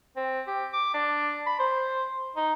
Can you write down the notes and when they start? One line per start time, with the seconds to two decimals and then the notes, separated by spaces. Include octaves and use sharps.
0.16 C4
0.47 G4
0.73 D6
0.94 D4
1.46 B5
1.59 C5
2.36 D#4